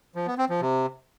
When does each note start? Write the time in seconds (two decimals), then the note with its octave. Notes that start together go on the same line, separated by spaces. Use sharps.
0.15 F3
0.27 B3
0.38 C4
0.50 F3
0.61 C3